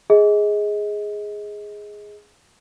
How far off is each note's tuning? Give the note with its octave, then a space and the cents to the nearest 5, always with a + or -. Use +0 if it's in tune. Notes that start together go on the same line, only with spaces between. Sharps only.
G#4 +0 D#5 +25